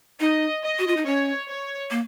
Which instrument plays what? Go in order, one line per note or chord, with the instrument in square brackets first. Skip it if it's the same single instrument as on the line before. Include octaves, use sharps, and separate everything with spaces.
[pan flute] D#4 [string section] D#5
[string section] D#5
[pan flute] F#4
F4
D#4
[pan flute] C#4 [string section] C#5
[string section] C#5
[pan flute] A#3